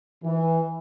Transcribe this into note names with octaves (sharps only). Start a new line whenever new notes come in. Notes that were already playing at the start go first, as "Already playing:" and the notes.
E3